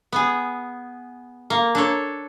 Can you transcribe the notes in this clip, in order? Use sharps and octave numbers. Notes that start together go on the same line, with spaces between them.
B3 G#4
A#3
D4 A4 C#5